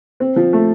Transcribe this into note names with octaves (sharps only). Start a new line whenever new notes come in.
C4
F3
A3